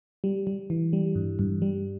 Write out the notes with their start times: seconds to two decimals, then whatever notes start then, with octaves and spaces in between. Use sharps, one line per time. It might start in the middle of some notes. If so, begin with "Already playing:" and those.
0.24 G3
0.47 G3
0.70 E3
0.93 G3
1.15 G2
1.39 G2
1.62 G3